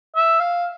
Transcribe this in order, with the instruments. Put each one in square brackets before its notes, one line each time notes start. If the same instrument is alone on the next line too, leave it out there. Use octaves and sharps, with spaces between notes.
[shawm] E5
F5